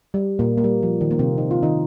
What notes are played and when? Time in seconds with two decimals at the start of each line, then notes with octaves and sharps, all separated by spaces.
0.14 G3
0.39 A#2 A#3
0.58 A#3
0.64 G3
0.83 F3
1.01 D#3
1.11 A#3
1.19 C3 C4
1.38 D#4
1.51 F4
1.62 D#3 D#4